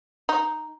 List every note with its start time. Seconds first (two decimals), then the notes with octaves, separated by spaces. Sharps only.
0.29 D#4